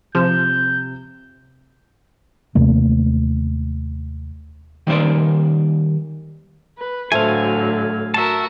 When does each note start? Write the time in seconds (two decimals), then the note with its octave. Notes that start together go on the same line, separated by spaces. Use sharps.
0.15 C3 F3 G6 E7
2.55 D#2 C3 A3 A#3
4.87 D#3 G3 A#3 C5 D5
6.76 B4
7.12 A2 D3 F#3 A3 C5 F5 G#5
8.14 F#4 A#4 E5 A5